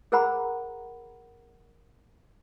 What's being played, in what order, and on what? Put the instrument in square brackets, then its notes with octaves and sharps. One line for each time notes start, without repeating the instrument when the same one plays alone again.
[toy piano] G#4 A#4 C5 F#5 A#5 B5